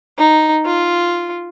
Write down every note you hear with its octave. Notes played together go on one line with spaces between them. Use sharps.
D#4
F4